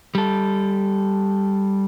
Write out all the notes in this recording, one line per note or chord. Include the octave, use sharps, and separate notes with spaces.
G3 A4